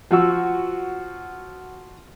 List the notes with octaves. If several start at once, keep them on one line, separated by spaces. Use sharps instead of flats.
F3 F#4 E6